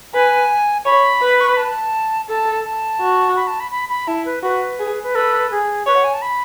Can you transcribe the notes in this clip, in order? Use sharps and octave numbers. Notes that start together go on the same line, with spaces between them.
B4 G#5
C#5 B5
B4
C#6
B5
A5
A4 A5
A5
F#4
B5
A5
B5
B5
B5
E4 A5
B4
F#4 B4
G#4
B4
A4 B4
G#4
B4 C#5
F#5
G#5
A5
B5